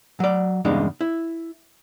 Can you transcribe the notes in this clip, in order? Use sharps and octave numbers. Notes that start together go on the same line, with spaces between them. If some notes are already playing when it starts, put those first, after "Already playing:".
F#3 D5
E2 G2 C#3 G#3 D4 D#4
E4